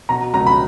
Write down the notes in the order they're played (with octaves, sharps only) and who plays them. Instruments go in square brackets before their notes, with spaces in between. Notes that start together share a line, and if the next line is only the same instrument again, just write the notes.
[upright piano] B2 A#5
C#2 A#5
B5